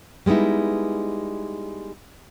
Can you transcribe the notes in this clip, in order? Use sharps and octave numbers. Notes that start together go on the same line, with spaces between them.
G3 G#3 B3 D#4 E4